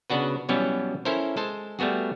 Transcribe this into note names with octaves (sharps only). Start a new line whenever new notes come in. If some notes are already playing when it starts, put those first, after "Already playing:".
C#3 B3 D4 F#4 B4
B2 E3 F#3 G3 B3 C#4
C#4 E4 A4 A#4 C5
G#3 A4 C5 A5
G3 A3 B3 F#4 G#4